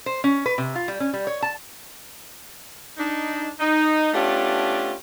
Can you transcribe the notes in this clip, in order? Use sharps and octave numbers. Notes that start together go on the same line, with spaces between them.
C5
C#4
B4
C3
F4
G3
C#4
G3
C#5
A5
D4 D#4
D#4
A3 B3 C#4 D4 F4 G4